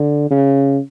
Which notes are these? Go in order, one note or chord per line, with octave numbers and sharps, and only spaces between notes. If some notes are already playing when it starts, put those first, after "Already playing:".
Already playing: D3
C#3